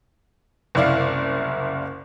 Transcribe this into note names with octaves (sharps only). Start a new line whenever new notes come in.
F#1 C2 E4 D5 F5